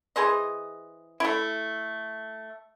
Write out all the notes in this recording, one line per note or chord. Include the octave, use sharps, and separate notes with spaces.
E3 G#4 C5 D#5
A3 E4